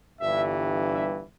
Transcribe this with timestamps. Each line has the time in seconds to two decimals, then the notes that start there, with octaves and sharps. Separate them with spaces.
0.21 G1 G2 E3 E5
0.95 E5